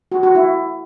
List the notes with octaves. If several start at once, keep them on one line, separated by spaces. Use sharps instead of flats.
F#4
F#4
E4